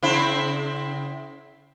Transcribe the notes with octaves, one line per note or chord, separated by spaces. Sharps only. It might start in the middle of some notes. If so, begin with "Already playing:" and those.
C#3 C4 E4